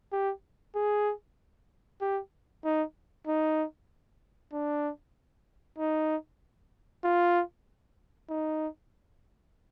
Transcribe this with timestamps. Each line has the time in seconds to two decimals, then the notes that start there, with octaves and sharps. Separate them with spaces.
0.13 G4
0.75 G#4
2.01 G4
2.64 D#4
3.27 D#4
4.53 D4
5.79 D#4
7.04 F4
8.30 D#4